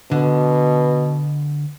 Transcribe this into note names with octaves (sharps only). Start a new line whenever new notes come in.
B2 D3